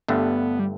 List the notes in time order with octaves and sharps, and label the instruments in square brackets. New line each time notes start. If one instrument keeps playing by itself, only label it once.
[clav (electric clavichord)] G1 G2 D3 A3 [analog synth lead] B3
[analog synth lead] G3